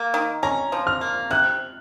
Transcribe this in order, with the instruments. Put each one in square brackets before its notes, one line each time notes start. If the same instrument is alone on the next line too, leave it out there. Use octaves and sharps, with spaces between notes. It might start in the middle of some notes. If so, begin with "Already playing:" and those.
Already playing: [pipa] A#3
D#3
[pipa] C#4 [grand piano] A#5
[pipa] F3
[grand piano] F6
[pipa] A#3
[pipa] C3 [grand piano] F#6